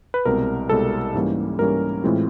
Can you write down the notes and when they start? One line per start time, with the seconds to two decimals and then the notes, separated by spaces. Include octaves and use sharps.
0.14 B4
0.25 C2 B2 G#3 C4 A#4
0.69 C2 B2 G#3 C4 A4
1.14 G#2 E3 G3 A#3 C#4
1.59 G#2 E3 G3 A#3 C#4 A#4
2.04 A2 E3 G#3 C4 F4